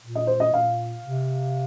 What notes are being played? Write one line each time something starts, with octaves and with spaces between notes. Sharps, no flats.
A#2
D#5
C5
D#5
A#2 F5
C3